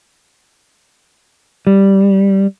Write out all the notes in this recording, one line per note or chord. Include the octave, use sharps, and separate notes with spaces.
G3